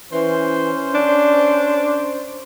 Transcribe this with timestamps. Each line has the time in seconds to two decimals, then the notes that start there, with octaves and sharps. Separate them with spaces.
0.13 E3 C#4 C5
0.94 D4